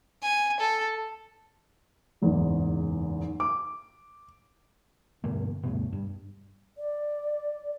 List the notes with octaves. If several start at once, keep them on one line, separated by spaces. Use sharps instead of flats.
G#5
A4
F#1 E2 G#2
D6
G2 B2 D3 A#3
D2 G2 B2
G2
D5